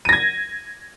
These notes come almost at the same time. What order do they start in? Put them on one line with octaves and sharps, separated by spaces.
D#7 A#6 G#6